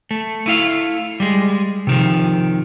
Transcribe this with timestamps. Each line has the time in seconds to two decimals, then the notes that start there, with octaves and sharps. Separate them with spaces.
0.11 A3
0.46 A3 E4 F5
1.20 G3 G#3
1.87 C3 D#3 F3